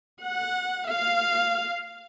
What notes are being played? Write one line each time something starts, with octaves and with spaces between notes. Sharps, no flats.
F#5
F5